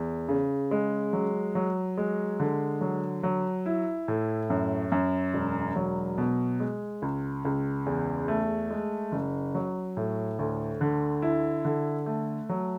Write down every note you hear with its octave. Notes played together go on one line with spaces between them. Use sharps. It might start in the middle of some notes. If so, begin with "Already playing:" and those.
Already playing: E2
C#3
G#3
F#3
F#3
G#3
D3
F#3
F#3
E4
A2
F#2
F#2
E1
F#3
B2
G#3
C#2
C#2
E2
A3
G#3
F#1
F#3
A2
D2
D3
E4
D3
A3
F#3